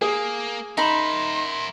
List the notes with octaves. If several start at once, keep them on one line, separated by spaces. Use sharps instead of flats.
A#3 G#4
D#4 A#4 E5 B5 C6